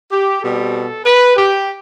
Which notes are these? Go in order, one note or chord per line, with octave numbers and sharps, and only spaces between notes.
G4
B2 G3 C4 A4
B4
G4